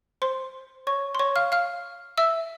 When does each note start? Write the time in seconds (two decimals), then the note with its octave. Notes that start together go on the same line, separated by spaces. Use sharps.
0.22 C5 C6
0.87 C#5 C#6
1.15 C6
1.19 C#5 C#6
1.36 F5 F6
1.52 F5 F6
2.18 E5 E6